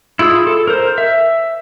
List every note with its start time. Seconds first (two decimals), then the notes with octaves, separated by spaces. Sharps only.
0.19 E4 F4 G#4 E6
0.47 A4
0.67 A#4 C5
0.98 E5